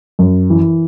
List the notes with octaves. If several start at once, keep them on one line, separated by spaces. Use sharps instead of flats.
F#2
E3